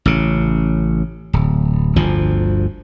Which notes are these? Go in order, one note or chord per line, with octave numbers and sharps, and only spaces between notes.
A1 C#3
D1
G1 D2 F3